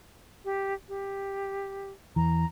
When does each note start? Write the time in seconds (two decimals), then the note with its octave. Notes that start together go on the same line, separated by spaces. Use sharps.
0.45 G4
0.89 G4
2.16 E2 E3 A#5